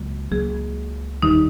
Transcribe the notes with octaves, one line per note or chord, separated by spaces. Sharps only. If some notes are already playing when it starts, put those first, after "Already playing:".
Already playing: C#2 C#3 F#3 A#3
C#2 C#3 F#3 A#3 G#4
F1 D#2 D#3 G3 D#4